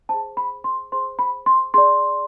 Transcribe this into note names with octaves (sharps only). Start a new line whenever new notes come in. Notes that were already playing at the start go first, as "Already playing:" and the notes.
G#4 C5 A5
B5
C6
G#4 C5 C6
B5
C6
G#4 D5 C6